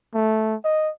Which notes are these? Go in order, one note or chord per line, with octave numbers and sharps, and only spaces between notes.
A3
D#5